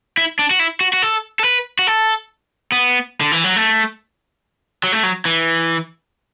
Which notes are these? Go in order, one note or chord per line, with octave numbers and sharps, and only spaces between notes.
E4
D4
F#4
E4
F#4
F#4
A4
A4
B4
F#4
A4
B3
D3
E3
F#3
A3
F#3
A3
F#3
E3